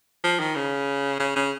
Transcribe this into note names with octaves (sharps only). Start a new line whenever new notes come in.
F3
D#3
C#3
C#3
C#3